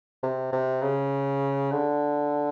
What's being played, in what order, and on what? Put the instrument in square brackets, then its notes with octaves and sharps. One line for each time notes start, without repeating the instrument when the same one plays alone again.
[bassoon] C3
C3
C#3
D3